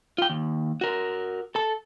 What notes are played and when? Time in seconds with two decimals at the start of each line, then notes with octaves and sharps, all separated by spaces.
0.18 F4 G5
0.30 D#2
0.81 F#4 A#4
1.55 A4 A5